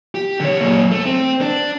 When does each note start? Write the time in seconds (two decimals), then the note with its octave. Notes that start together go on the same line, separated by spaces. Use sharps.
0.15 G4
0.40 D3 C#5
0.60 F#2 A#2
0.91 A3
1.05 C4
1.41 D4